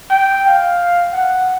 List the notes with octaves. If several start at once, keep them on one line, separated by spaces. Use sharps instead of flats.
G5
F5
F#5